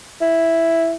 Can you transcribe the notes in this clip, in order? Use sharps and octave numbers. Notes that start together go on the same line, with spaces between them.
E4